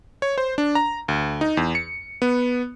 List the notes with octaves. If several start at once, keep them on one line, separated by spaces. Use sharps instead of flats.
C#5
C5
D4
A#5
D2
D#4
E2
C#7
B3